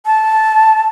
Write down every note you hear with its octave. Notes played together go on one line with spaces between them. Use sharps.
A5